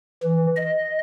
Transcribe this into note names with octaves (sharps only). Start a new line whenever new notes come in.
E3
D#5